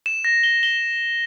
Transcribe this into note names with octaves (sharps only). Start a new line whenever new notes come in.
E7
A#6
G7
G7